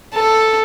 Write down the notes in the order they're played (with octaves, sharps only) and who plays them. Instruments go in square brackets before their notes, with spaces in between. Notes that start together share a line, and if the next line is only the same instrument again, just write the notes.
[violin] A4